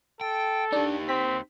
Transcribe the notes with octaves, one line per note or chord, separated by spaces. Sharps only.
A4 G5
D4 D#4 G4
C4 B6